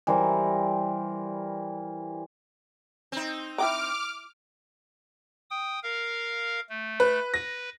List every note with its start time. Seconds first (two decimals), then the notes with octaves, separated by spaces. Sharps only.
0.07 E3 G3 A#4 C5
3.12 C4 D#4
3.58 E4 G5 A#5 D6 F6
5.51 G5 D#6
5.83 A#4 F5
6.70 A3
7.00 B4
7.34 B4 A#6